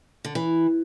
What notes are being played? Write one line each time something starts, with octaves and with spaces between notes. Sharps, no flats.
D3
E3